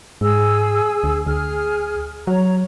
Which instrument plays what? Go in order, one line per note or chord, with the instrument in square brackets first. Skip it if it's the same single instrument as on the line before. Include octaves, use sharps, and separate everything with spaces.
[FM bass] G#2 [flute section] G#4 E6
[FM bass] D2
[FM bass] D2 [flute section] G#4 F6
[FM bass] F#3 [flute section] C#5 A#5